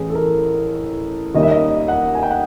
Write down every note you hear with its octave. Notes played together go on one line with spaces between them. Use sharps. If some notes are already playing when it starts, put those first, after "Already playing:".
Already playing: A1 A2 E3 G#4
A4
A#4
D#2 D#3 G3 A#3 C#4 D#5
E5
D#5
F#5
G#5
G5
F#5